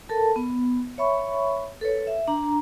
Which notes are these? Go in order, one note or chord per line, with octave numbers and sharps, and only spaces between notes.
A4 A#4 A5
B3
C#5 E5 B5 C#6
A4 B4 C#5
E5
D4 A#5